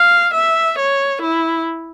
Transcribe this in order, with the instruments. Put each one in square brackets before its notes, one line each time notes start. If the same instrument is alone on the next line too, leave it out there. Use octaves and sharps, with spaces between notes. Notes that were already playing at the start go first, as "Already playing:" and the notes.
Already playing: [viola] F5
E5
C#5
E4